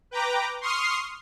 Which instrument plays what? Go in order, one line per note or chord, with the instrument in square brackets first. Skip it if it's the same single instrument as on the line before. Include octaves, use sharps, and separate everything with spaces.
[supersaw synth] B4 G5 A#5 D6
C6 C#6 D#6 F6 C7